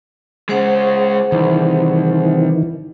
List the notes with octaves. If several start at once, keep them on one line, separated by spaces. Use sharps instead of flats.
C#3 G#3 G#4 C5 F#5
C2 D#3 E3